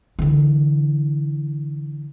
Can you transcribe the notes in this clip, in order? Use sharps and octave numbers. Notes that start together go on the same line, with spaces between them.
D3 E3